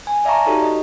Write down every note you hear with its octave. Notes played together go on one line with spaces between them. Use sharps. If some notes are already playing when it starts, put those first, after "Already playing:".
G#5
D5 E5 F5 A5 A#5 C#6
D#4 F#4 G4 A4 C#5
D#5